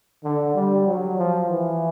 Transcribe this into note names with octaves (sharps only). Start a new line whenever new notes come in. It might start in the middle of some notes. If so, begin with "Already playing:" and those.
D3
G3
F#3
F3
E3